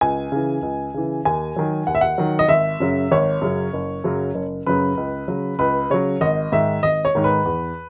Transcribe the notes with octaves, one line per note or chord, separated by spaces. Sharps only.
C#2 G#5
C#3 E3
C#2
C#3 E3
D#2 G#5
D#3 F#3
D#2 F#5
E5
F#5
D#3 F#3
D#5
G#1 E5
F#2 C#3 F#3
G#1 C#5
F#2 C#3 F#3
F#1
F#2 C#3 F#3
F#1
F#2 C#3 F#3 B4
C#2
C#3 F#3
C#2 B4
C#3 F#3 C#5
G#1 D#5
G#2 D#3 E5
G#1 D#5
C#5
G#2 D#3
B4
E2